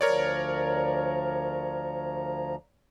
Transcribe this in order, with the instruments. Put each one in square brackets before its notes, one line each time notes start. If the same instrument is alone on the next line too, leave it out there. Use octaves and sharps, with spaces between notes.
[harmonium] D2 F3 A#5 [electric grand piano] A#4 C#5 D5